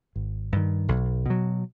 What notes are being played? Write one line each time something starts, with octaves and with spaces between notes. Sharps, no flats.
G#1
G2 D#3
B1
B2 F#3